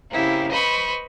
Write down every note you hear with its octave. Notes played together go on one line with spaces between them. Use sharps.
C#3 A#3 C4 E4 G4
B4 C5 D#5 B5 C#6